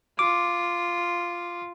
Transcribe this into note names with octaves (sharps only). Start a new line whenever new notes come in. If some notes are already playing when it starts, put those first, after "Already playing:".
F4 D6